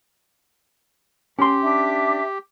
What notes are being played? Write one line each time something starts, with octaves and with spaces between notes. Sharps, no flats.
C#4 G4 C6
D4 E5 D6